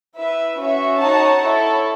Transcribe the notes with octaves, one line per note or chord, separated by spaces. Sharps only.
E4 B4 E5
C#4 F#4 C#5 E5
D#4 F#4 C#5 F#5 A5
E4 A4 C#5